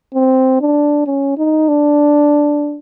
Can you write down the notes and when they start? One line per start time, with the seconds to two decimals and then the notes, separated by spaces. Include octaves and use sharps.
0.15 C4
0.61 D4
1.06 C#4
1.38 D#4
1.68 D4